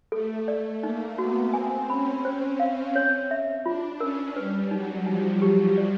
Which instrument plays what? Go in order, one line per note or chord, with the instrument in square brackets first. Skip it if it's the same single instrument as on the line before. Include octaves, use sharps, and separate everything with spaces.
[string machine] A3 [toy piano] A4
[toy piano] D5
[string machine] A#3 [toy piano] D#4
[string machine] B3 [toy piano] F#4
[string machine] C4 [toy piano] G#5
[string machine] C#4 [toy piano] B5
[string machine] C#4 [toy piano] C5
[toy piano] F5
C#5
E5
[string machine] D4 [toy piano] F4
[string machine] C#4 [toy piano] A#4
[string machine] G3 [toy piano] B4
[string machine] F#3 [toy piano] D#4
[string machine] F3 [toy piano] D#4
[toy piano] G4
D5